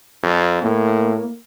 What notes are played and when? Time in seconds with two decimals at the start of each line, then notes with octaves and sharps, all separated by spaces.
0.23 F2
0.63 A2 A#3